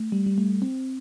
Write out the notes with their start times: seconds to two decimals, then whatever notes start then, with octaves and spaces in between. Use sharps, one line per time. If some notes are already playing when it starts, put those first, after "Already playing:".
Already playing: A3
0.12 G3
0.26 G3
0.38 A3
0.62 C4